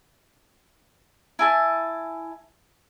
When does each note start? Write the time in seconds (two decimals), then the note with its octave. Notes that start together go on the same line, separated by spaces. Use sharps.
1.39 E4 G#5 A5